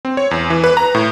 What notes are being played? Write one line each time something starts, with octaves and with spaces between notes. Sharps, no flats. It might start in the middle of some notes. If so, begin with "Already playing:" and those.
C4
C#5
E2
E3
B4
A#5
A2